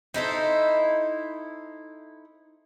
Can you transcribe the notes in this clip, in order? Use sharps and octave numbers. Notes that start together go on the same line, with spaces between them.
D#4 E4 A4 C5